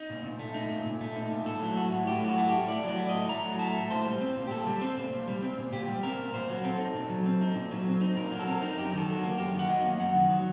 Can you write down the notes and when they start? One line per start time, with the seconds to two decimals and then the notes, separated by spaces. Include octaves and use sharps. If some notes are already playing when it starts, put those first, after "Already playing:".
Already playing: D#4
0.10 A#2
0.24 A#2
0.39 A3
0.54 D#4
0.70 A#2
0.86 A#2
1.01 A3
1.16 D#4
1.32 A#2
1.46 A2 A4
1.62 F#3
1.76 A3 F#4
1.92 A2
2.07 A2 G4
2.23 F#3
2.28 F#4
2.38 A3
2.48 A2 G4
2.68 A2 D5
2.84 F#3 D5
2.98 A3
3.09 A2 D#5
3.29 A2 A#5
3.44 F#3
3.59 A3 A5
3.75 A2
3.90 A#2 C5
4.06 G3
4.21 C4
4.36 A#2
4.47 G4
4.50 A#2 A4
4.67 G3
4.81 C4 C5
4.97 A#2
5.12 A#2
5.27 G3
5.42 C4
5.58 A#2
5.72 A#2 G4
5.88 G3
6.03 C4 A#4
6.18 A#2
6.34 A#2 C5
6.49 F#3
6.64 C4 A4
6.80 D#4
6.94 A#2
7.09 F#3
7.25 C4
7.41 D#4
7.55 A#2
7.71 F#3
7.87 C4
8.01 D#4
8.16 A#2 A#4
8.32 F#3
8.39 A4
8.47 C4 A#4
8.62 D#4
8.77 F#2 G4
8.93 D#3 A4
9.08 F#3
9.24 A#3
9.38 F#2 G4
9.54 D#3
9.59 F#5
9.68 F#3 D#5
9.84 A#3
10.00 F#2 F#5
10.15 D#3
10.30 F#3